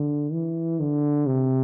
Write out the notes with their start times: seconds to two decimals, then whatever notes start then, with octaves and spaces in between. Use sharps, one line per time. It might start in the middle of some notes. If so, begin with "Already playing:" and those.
Already playing: D3
0.32 E3
0.80 D3
1.27 C3